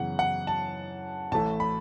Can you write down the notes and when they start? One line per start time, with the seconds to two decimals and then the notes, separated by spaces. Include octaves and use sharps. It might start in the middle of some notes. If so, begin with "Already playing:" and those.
Already playing: F#2 C#3 E3 B3 F#5
0.19 F#5
0.47 A5
1.31 A1 A2 E3 A3 A5
1.60 B5